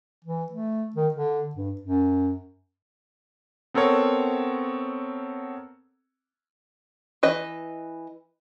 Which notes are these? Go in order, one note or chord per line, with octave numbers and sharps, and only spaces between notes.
E3
A3
D#3
D3
G2
F#2
B3 C4 A4 A#4 C#5 F#5
E3 B4 D#5